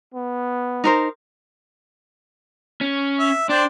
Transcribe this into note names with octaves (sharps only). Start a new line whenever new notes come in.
B3
D#4 A#4 C5
C#4
E5
D4 C5 D5 G5